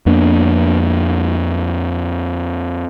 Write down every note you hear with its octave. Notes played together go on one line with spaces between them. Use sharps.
F2 A#3 B3 D4